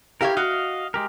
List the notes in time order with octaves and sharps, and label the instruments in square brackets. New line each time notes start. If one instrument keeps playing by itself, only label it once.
[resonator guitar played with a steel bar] E4 G4 F5 [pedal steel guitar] A#4 C#5
[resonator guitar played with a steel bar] F#4 [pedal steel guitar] D#5 F5
[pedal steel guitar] G#3 G4 A#4